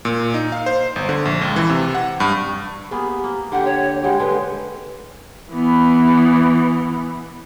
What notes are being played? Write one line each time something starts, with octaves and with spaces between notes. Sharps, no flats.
A#2
D#4
F5
C5
G1
D3
A#1
C#2
E3
C3
F#5
G2
A#3 B3 G4 G#4
A#3
D3 D4 G4 F#5
C#5
G3 G#3 G4 F#5
D3 G#3 B4
E3 B3